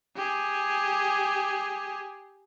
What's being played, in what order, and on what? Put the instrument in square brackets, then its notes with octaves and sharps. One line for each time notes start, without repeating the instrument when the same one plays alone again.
[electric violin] G4 G#4